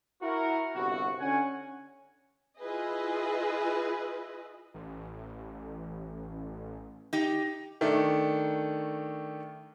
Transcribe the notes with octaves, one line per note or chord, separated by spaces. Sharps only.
E4 F#4 A#4
G1 C2 E4 F#4
D3 C#4 F#5 G#5
E4 F4 G#4 B4 D#5
A1
D#4 G4
D#3 A3 D4